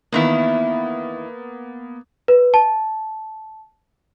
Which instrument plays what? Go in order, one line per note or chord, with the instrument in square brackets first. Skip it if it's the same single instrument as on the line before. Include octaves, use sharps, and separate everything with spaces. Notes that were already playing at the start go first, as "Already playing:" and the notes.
[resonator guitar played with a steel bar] E2 D#3 E4 [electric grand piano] A#3 B3
[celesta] B4
A5